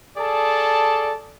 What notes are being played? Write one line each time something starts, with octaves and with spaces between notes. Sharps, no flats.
G#4 A4 D5 A5